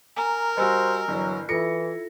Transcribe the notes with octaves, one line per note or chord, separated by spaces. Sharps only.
A#4 G#5 A#5
G3 F#4 C5 D#5 G#5 E6
G1 E3 F#3
E3 E4 F4 A4 A#6 C#7